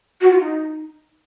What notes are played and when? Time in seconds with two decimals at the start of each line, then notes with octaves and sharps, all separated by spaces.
0.20 F#4
0.30 F4
0.39 D#4